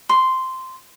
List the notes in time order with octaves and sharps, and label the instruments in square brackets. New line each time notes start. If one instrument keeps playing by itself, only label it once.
[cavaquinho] C6